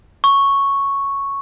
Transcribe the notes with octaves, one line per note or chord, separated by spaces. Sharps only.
C#6